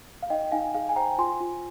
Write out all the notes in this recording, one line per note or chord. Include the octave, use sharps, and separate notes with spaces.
F5
D#4 D#5 G5
D#4 F5 G#5
G#4 F5
G#5
C5 G5 A#5
F4 G#5 C6
F4